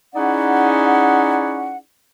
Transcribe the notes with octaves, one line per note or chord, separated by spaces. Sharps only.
C#4 D#4 E4 G#4 D5 F#5